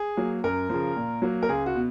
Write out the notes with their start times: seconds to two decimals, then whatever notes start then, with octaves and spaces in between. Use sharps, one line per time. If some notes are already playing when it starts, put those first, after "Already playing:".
Already playing: G#4
0.17 F#3 A#3
0.44 F#2 A#4
0.69 C#3 F3
0.96 A#2
1.22 F#3 A#3
1.43 A#4
1.49 C#2 G#4
1.66 F#4
1.75 B2